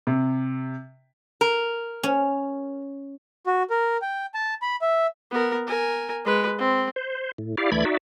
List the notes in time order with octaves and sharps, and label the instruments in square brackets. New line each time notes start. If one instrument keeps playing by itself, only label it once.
[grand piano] C3
[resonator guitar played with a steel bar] A#4
[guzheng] C#4
[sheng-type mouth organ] F#4
A#4
G5
A5
B5
E5
[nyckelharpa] B3 A#4
A#4 G#5
G#3 B4
C4
[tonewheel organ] C5
A2
E4 G4 D5 F5
D2 E3 A3 D5 B5 G#6
D#4 F#4 D5 E5